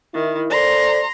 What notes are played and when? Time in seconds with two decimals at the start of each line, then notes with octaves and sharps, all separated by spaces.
0.14 D#3 E4
0.50 A4 C5 D5 A#5 C6